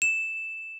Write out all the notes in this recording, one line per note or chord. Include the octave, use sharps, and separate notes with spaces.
E7